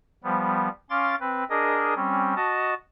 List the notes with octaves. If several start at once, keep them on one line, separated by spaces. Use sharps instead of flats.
F3 G3 B3
C#4 F5 C6 D6 A6
C4 B4
D4 G#4 A#4 D#5
G3 C4 C#4
F#4 D#5 A5